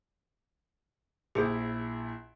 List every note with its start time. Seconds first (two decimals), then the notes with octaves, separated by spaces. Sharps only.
1.35 A#1 E4 G4 G#4 C5